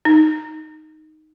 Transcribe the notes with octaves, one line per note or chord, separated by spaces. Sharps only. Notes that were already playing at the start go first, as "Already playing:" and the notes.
D#4